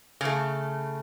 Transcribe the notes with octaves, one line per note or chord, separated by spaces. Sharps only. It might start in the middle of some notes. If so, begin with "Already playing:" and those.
C#3 A3